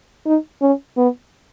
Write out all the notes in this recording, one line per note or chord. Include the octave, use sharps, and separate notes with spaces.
D#4
C#4
B3